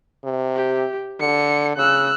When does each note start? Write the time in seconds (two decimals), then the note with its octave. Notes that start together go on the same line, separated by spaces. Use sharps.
0.24 C3
0.56 G4
1.20 D3 C#7
1.77 C#3 E6 F#6